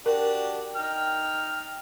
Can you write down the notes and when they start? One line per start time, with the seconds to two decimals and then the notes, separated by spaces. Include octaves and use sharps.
0.06 D4 F#4 G4 A#4
0.76 D#4 G5 F6